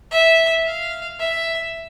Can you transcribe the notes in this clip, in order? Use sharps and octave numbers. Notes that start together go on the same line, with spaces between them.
E5
F5
E5